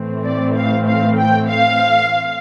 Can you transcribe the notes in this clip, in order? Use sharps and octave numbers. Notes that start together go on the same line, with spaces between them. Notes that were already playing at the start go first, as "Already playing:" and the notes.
Already playing: A2 E3 A3 C4
D5
F5
F5
G5
F5